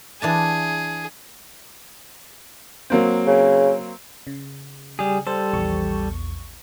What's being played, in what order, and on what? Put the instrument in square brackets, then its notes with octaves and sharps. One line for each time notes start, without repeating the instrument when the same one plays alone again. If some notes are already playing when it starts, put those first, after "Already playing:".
[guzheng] E3 D4 A5 [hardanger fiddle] G#4
[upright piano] F#3 A#3 C4
[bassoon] C#3
[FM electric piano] C#3
[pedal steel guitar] G3 G#4
[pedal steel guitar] G3 A4 [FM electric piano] C5
[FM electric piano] A#1 E2 C#6